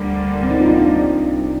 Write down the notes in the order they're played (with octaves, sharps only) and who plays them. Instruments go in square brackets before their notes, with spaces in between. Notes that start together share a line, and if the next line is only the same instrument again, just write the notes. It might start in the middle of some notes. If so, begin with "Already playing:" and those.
Already playing: [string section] D2 D3 G3 A#3
[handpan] C4
D#4
F4
D#4
D4
[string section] C2 C3 G3